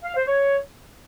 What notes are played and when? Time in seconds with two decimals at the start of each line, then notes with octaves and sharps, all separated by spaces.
0.04 F5
0.16 C5
0.28 C#5